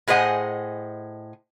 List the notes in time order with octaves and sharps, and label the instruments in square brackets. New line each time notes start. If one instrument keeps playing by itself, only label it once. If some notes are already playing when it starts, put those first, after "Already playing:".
[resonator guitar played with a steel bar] A2 G#4 C5 D#5 F#5 G#5